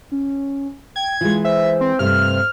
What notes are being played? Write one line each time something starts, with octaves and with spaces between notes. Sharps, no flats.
C#4
G5 G#6
E3 G#3 F4
C5 E5
C4
G2 C3 A3 F6